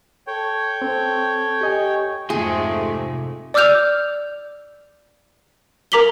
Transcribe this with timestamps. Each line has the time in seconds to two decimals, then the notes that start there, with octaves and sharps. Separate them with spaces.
0.27 A4 C#5 G5
0.82 C4 A4
1.61 G4 D#5 G#5
2.30 F2 G#2 C3 G#3 A3 G#4 C6
3.54 D5 D6 E6 F6 G6 F7
5.92 A#4 A#5 D6 B6 F#7 G7